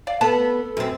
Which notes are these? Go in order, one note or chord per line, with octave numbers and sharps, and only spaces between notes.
D5 F5
B3 A4 A5
F#2 C4